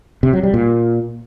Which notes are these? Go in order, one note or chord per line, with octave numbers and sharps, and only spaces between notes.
C3
F#3
G3
A#2